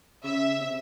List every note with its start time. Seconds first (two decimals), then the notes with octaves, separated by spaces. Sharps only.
0.24 C#3 E5
0.61 C3